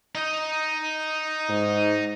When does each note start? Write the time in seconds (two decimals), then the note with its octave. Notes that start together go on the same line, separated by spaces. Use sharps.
0.15 D#4
1.49 G#2